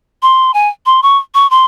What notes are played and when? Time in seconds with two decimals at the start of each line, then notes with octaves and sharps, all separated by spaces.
0.22 C6
0.54 G#5
0.86 C6
1.03 C#6
1.34 C#6
1.51 C6